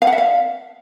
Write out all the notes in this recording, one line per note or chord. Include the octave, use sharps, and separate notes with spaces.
F5
F#5
E5
F5